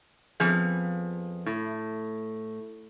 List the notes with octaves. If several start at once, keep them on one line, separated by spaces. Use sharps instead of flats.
F2 F3 B3 G#4 F5
A2